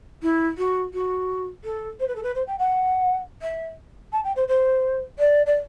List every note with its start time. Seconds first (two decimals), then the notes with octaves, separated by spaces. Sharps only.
0.22 E4
0.58 F#4
0.94 F#4
1.64 A4
2.00 C5
2.08 B4
2.16 A4
2.23 B4
2.35 C5
2.47 G5
2.59 F#5
3.42 E5
4.12 A5
4.24 G5
4.36 C5
4.48 C5
5.19 D5
5.46 D5